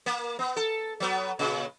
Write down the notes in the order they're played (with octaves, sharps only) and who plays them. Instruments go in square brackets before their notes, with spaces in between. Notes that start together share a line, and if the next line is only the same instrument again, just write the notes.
[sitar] A#3
B3
A4
F#3 B3
A#2 C#3